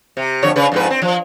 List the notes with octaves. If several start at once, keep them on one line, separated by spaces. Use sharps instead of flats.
C3
F2 D3 C#5
C#3 B4
F2 G#2 B4
C4
F3